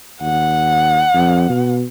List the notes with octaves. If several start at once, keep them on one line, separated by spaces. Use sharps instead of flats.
D#2 F#5
F2
B2